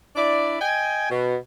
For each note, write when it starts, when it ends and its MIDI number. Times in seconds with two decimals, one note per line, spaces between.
0.16 0.60 62
0.16 0.60 64
0.16 0.60 74
0.60 1.09 75
0.60 1.09 79
0.60 1.09 80
1.10 1.36 47